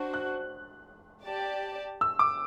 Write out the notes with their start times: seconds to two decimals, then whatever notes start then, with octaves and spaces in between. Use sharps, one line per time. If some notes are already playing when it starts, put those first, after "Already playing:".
Already playing: D4 F#4 C5
0.14 F#6
1.26 G4 D5 A5
2.01 E6
2.19 D6